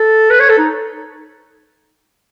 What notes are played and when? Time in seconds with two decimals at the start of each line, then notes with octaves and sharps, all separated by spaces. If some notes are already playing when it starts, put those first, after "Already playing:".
Already playing: A4
0.30 B4
0.40 C#5
0.49 A4
0.58 D#4